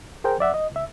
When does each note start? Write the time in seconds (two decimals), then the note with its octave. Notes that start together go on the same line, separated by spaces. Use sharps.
0.24 G#4 A#4 C5 G5
0.39 F#2 D5 E5 F#5
0.54 D#5
0.72 C#2 E5